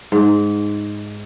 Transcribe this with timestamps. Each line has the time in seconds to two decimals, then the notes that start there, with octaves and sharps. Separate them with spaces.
0.12 G#2